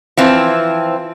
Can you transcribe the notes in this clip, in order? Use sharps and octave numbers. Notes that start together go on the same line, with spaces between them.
E3 F3 C4